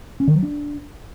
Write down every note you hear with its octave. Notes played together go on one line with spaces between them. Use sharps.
C#4
D#3
F#3
D4